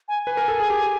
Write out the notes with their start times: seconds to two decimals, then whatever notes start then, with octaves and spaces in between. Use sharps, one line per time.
0.08 G#5
0.23 B4 G#5
0.37 A#4
0.48 A4
0.60 G#4
0.70 G4